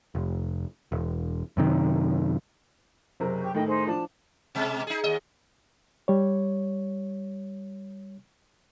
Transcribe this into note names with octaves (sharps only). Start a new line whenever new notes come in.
F1
E1
F#2 C3 D#3
F#1 C3 A#4
G4 C#6 G6
A2 D#3 A3 D#5 G5
D#4 G#4 C5
F3 D4 A5
B2 G#3
D#4 G#4
D#2 D#5
G3 C#5